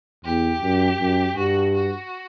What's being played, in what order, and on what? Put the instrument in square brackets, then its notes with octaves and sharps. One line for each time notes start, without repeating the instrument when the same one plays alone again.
[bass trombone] E2 [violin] G4
[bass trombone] F#2
F#2
[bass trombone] G2 [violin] F#4
[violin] F#4